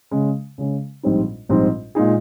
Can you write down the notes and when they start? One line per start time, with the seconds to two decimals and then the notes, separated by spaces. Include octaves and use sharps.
0.11 C#3 G#3 C#4
0.58 C#3 G#3 C#4
1.03 A#1 G#2 G3 C4 D#4
1.49 A#1 G#2 G3 C4 D#4
1.95 A#2 G#3 D#4 G#4